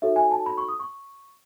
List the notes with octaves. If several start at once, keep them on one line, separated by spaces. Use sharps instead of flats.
D#4 F#4 A4 C#5 E5
G#5
A5
B5
C#6
D#6
C#6